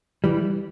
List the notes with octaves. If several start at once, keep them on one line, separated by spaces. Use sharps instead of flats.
E3 G3